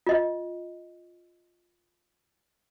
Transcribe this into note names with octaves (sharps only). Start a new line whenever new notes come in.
F4 D#5